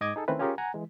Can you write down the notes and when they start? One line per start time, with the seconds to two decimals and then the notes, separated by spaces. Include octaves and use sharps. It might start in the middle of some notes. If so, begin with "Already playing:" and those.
0.01 G#2 D#5 D6 G#6
0.16 D#4 G#4 A4
0.28 D#3 A3 C4 C#4 E4 B4
0.39 C#4 F4 G4 G#4 A#4
0.58 F#5 G#5 A#5
0.74 E3 G#3